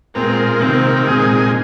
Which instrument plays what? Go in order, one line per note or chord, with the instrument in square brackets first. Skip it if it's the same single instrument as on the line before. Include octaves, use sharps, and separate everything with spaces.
[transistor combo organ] A#2 G#3 F4 A#4 [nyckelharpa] C4
[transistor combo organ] C3 D#3 A#3 [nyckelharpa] C4
[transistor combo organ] A#2 G#3 D#4 G#4